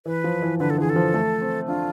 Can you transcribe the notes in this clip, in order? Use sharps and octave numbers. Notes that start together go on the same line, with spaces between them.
E3 B4
F3
E3
D3 B4
A4
E3 G#4
A4
F3
A3
C4
D4 F4